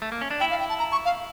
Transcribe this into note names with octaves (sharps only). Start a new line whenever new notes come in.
A3
A#3
C#4
D4
E4 G5
F5
G5
A5
A#5
C#6
F5